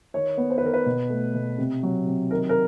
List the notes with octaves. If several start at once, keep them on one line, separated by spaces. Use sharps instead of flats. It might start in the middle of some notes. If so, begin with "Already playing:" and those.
D#3 C#5
B3
C5
B4
D#3 A#4
B4
B2
A3
B2
C3
F#3
C3
D#3 A#4
A#4